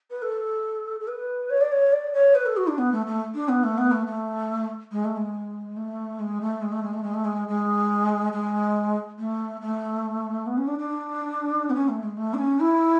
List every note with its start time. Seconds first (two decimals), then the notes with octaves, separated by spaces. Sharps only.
0.10 B4
0.22 A4
1.00 A4
1.07 B4
1.50 C#5
1.61 D5
1.71 C#5
1.92 D5
2.13 C#5
2.35 B4
2.46 A4
2.56 F#4
2.67 D4
2.78 B3
2.92 A3
3.06 A3
3.34 D4
3.48 B3
3.63 A3
3.77 B3
3.91 A3
4.06 A3
4.91 G#3
5.04 A3
5.16 G#3
5.76 A3
6.19 G#3
6.41 A3
6.62 G#3
6.72 A3
6.83 G#3
6.93 A3
7.03 G#3
7.14 A3
7.24 G#3
7.48 G#3
8.32 G#3
9.18 A3
9.61 A3
10.46 B3
10.57 C#4
10.67 D4
10.78 D4
11.70 B3
11.74 C#4
11.88 A3
12.03 G#3
12.17 A3
12.33 D4
12.38 C#4
12.59 E4